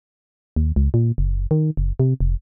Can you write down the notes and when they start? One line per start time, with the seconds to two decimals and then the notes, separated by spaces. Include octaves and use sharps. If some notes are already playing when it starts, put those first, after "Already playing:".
0.56 D#2
0.76 C#2
0.94 A#2
1.18 F#1
1.51 D#3
1.77 F#1
2.00 C3
2.21 F1